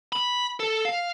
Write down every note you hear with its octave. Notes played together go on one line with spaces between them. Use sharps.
B5
A4
F5